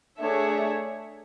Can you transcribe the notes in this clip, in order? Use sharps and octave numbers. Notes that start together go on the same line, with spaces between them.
A3 D4 G#4 C#5 E5